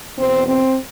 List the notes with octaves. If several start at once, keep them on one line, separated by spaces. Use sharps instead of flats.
E2 B2 C4
C4